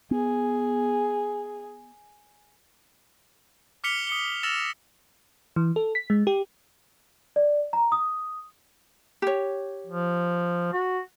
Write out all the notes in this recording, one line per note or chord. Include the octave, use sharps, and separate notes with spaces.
B3 G#4
D6 F6 B6 C#7 F7 G7
D#6 C#7 G7
E6 F6 A6 A#6 E7 F7
E3
A4
B6
G#3
G4
D5
A#5
D#6
G4 C#5
F3
F#4